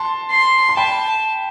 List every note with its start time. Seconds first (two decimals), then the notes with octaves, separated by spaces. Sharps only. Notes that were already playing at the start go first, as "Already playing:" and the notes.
Already playing: A5 C6
0.31 C6
0.69 C6
0.77 G5 A5 B5